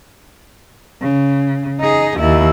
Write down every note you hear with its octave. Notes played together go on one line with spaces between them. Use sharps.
C#3
D#4 G#4
D#2 E4